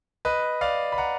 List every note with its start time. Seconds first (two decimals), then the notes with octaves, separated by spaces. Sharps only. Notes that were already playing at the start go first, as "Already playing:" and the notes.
0.25 B4 D#5
0.61 D5 F5
0.92 B5
0.98 F#5 A#5